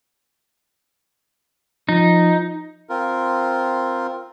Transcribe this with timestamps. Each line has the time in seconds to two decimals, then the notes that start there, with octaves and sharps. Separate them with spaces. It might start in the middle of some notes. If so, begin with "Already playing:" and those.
1.89 F3 D#4
2.89 C4 F4 A#4